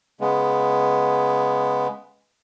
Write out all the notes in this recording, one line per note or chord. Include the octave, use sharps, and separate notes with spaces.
C#3 G#3 B3